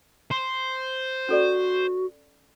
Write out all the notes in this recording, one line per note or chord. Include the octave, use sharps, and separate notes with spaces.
C5
C#4 F#4 A4 D5